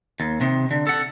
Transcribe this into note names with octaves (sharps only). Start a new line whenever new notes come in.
D#2
C3 D#3
D3
A4 F#5